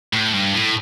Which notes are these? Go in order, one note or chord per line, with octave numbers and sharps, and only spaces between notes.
A2
G2
A2